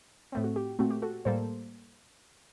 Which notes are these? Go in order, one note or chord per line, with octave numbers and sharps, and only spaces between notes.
A2 A3 C4
F#4
G4
A#2 A3 C4 F#4
G4
F#4 A4
A2 G3 A#3 A4 C5